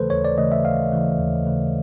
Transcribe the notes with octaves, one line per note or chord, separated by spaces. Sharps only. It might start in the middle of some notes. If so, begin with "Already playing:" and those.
Already playing: D#2 C#3 E3 A3 A4 B4 C5
D#2 C#5
D5
C#3 E3 A3 D#5
E5
D#2 F5
C#3 E3 A3
D#2
C#3 E3 A3